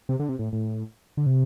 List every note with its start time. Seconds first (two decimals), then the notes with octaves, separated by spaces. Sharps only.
0.09 C3
0.20 D3
0.29 C3
0.39 A2
0.53 A2
1.17 D3
1.26 C3